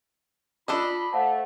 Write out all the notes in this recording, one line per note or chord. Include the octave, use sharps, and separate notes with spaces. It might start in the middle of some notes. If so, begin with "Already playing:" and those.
D4 F4 A4 D#5 B5
A3 C5 F5 F#5 A5